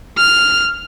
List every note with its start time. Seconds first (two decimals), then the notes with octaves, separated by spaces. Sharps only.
0.17 F6